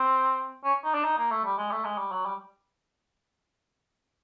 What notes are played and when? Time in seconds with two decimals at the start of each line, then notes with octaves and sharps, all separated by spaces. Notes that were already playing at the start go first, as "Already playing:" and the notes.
Already playing: C4
0.64 C#4
0.84 D#4
0.94 D4
1.04 D#4
1.18 A#3
1.31 A3
1.45 G3
1.58 G#3
1.71 A3
1.85 G#3
1.98 G3
2.12 F#3
2.26 G3